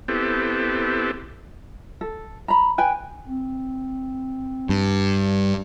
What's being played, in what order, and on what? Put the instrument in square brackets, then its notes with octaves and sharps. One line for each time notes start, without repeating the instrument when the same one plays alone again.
[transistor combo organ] B3 C4 E4 G4 A4
[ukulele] A4
A#5 B5
B4 G5 G#5
[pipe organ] C4
[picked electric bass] G2